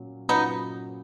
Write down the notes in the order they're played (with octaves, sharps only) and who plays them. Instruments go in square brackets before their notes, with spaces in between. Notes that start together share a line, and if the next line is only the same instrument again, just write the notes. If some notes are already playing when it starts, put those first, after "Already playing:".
Already playing: [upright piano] A#2 F#3 C#4
[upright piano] A#2 F#3 C#4 [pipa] B3 D#4